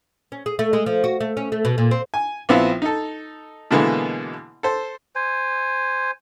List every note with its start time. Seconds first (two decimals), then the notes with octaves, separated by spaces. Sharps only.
0.32 C#4
0.46 G#4
0.59 A3
0.73 G#3
0.86 F3
1.04 F#4
1.21 A3
1.37 C#4
1.52 A3
1.65 B2
1.78 A#2
1.91 C4
2.14 G#5
2.49 A#1 B3 C4 E4 F4
2.82 D#4 A4
3.71 B2 D3 E3 G#3 A#3 B3
4.63 A4 C5
5.16 C5 G#5